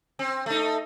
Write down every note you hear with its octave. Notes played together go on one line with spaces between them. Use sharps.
C4
A3 D#4